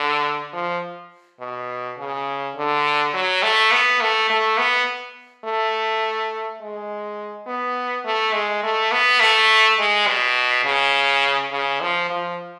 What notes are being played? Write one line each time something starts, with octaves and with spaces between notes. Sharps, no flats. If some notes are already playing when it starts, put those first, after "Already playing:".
Already playing: D3
F3
B2
C#3
D3
F#3
A3
B3
A3
A3
B3
A3
G#3
B3
A3
G#3
A3
B3
A3
G#3
B2
C#3
C#3
F3
F3